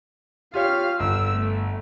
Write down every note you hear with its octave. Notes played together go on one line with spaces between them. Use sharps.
F4 G4 C#5 F5 F6
G1 E6
A3